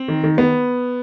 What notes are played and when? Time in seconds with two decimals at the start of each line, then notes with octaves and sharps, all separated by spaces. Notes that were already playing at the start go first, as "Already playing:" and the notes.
Already playing: C4
0.08 D#3
0.24 D#3
0.37 D#3 B3